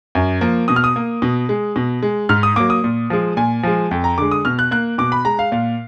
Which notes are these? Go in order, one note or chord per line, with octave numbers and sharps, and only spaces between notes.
F#2
F3 A#3
B2 D#6
F6
D#6
A#3
B2
G#3
B2
G#3
G#2 F6
D#6
F#3 A#3 D6
D#6
A#2
F3 G#3
A#2 G#5
F3 G#3
F2
A#5
D3 G#3 D6
D#6
B2 F6
F#6
A#3 F#6
B2 D6
B5
G#3 A#5
F5
A#2 F5